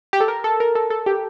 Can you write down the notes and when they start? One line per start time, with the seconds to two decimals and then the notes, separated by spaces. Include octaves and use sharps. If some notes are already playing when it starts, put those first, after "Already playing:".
0.13 G4
0.20 A4
0.28 A#4
0.44 A4
0.60 A#4
0.75 A4
0.90 A4
1.06 G4